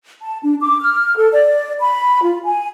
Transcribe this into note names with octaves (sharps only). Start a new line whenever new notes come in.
A5
D4
D6
F6
A4
D5
B5
F4
G#5